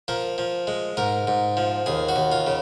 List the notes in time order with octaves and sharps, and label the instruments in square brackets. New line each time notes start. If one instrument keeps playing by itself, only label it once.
[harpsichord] F3 A#4
F3
G#3
G#2 A#4
G#2
F3
D#2 G#4
F#4
D#2
F4
C#3